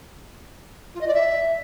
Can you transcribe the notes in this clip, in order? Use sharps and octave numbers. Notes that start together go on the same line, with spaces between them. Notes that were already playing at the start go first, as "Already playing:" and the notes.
F4
D#5
D5
E5